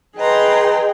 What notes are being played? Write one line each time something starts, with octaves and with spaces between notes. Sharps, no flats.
G#4 B4 D#5 G5 A#5 C6